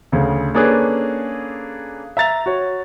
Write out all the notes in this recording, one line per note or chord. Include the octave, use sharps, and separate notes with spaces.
D2 C#3
A#3 C#4 D4 G#4 A4 B4
E5 A#5 A6 F7
F#4 C#5